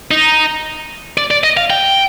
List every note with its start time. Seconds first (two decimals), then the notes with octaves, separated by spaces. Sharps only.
0.11 D#4
1.18 D5
1.31 D5
1.44 D#5
1.57 F5
1.70 G5